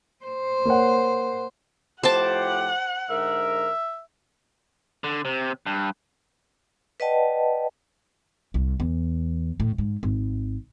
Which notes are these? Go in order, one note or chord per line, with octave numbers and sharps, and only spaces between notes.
C5
A#3 C#5 F#5
A2 F3 G4 C5 F#5 G5 A5
G#2 D3 A#4 E5
D3
C3
G2
B4 D5 D#5 F#5 G5 A5
C2
E2
A2
G#2
G#1